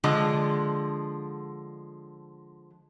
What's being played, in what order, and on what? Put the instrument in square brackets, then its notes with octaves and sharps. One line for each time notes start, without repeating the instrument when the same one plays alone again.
[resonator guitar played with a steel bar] D3 F3 G#3